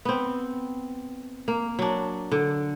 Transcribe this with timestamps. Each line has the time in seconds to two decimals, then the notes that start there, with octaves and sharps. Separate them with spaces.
0.05 B3 C4
1.48 A#3
1.79 F#3 D4
2.32 D3